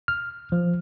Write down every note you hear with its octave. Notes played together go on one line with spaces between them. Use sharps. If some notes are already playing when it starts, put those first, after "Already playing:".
F6
F3